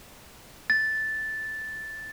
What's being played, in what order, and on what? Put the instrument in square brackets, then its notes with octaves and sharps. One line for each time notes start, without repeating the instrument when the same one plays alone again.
[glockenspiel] A6